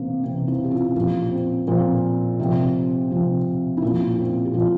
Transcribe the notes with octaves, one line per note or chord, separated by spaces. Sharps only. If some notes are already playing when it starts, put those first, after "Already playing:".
Already playing: C3 E3 A#3 C4 C#4
C3 E3 C4
C4 E4
G4
C#4 F4
A#2 F3 A#3 C#4
C4
A#2 F3 C4
C3 F3
C3 F3
E4
A#2 F3 A#3 C#4
C4 E4
G4
A#2 F3 C#4 F4